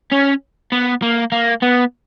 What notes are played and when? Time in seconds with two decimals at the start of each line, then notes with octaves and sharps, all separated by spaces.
0.12 C#4
0.72 B3
1.02 A#3
1.32 A#3
1.62 B3